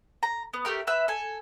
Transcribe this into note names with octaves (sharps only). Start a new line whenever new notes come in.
A#5
B3
A3 B3 G4 A#4
B4 E5 E6
A4 G#5